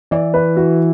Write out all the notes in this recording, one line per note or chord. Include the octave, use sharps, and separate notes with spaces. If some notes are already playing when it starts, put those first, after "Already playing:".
E3 D5
B4
F#4